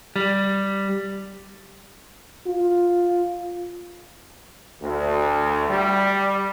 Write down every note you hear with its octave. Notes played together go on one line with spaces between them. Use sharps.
G3
F4
D2
G3